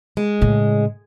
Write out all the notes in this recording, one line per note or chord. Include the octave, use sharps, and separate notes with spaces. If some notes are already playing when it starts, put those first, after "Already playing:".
G#3
A2 C#3